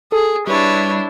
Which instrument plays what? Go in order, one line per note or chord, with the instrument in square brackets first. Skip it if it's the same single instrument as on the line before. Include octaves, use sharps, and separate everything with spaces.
[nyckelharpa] G#4 [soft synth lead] A4
[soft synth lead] G3 [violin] D4 E4 [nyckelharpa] B4 C#5